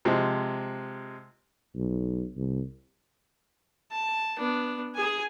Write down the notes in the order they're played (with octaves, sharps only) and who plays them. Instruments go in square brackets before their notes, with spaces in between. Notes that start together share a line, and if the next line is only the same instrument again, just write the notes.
[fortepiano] C3 F3 G#3
[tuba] B1
C2
[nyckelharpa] A5
B3 D4
G#4 G#5